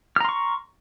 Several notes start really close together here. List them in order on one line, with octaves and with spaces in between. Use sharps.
F6 A#5 C6 C#6